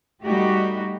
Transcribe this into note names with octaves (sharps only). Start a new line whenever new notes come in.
G3 A3 D#4 F#4 G4